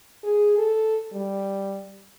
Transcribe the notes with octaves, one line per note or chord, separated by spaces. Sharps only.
G#4
A4
G3